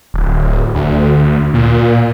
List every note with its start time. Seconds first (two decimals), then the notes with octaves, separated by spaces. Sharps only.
0.14 D1
0.75 D2
1.54 A#2